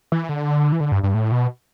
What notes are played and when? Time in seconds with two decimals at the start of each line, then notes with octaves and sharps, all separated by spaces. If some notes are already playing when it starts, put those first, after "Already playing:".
0.12 E3
0.29 D3
0.72 E3
0.80 D3
0.92 G2
1.03 G2
1.14 A2
1.32 B2